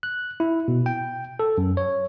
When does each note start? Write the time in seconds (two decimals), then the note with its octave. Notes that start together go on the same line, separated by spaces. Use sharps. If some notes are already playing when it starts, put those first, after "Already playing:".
0.03 F#6
0.40 E4
0.68 B2
0.86 G5
1.39 A4
1.58 F#2
1.77 C#5